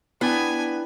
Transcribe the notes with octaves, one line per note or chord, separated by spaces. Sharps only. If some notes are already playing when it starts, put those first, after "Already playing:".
B3 D4 E4 G5 G#5